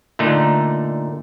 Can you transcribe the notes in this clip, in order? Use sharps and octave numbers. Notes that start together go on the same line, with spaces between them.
A#2 D3 A3 D#4